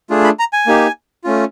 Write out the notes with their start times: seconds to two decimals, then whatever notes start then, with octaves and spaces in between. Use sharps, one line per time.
0.10 A3 D4 F4 G#4
0.24 B5
0.39 A#5
0.53 G#5
0.67 A#3 D#4 G4
1.24 A3 C#4 F4